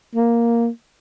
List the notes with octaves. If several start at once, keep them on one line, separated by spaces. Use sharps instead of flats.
A#3